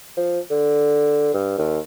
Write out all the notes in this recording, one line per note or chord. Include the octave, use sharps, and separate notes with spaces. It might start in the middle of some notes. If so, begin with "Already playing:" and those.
F3
D3
G2
D#2